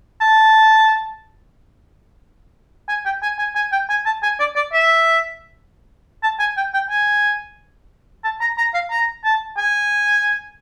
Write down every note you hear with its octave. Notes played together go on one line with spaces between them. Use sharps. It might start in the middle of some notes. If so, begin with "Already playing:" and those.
A5
G#5
G5
G#5
G#5
G#5
G5
G#5
A5
G#5
D5
D5
E5
A5
G#5
G5
G5
G#5
A5
A#5
A#5
F5
A#5
A5
G#5